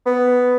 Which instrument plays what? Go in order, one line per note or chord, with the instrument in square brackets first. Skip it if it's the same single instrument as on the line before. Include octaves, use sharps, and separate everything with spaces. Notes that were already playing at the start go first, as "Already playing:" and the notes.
[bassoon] B3